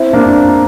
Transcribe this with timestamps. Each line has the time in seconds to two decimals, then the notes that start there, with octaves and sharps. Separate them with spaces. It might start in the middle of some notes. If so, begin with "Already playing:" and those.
Already playing: C4 E4
0.13 A#3 D4